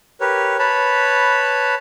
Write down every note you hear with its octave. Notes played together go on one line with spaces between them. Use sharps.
G4 A#4 B4 C#5
B4 C#5 A5 B5